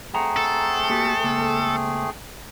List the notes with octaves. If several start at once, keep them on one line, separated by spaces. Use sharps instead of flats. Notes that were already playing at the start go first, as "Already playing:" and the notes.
A3 C4 G#4 F#5 A#5
A4
A#3 F#4 G4
C#2 A#3